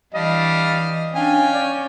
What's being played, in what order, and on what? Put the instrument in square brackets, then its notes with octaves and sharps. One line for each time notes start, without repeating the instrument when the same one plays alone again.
[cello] E3 [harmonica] G3 D4 F5 [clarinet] D#5
[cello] C#4 [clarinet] D4 [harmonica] F5 G5 G#5
[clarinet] D5